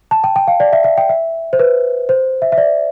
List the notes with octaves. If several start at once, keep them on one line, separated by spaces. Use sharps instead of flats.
A5
G5
G5
F5
D5
E5
E5
G5
E5
C5
B4
C5
E5
E5
D5